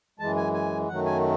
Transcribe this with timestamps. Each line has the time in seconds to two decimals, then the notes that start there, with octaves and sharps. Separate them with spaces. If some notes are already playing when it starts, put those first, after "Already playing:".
0.19 F#2 E3 G#3 A5
0.36 G#5
0.54 G#5
0.88 F#2 D#3 F#3 A3 F#5
1.05 G#5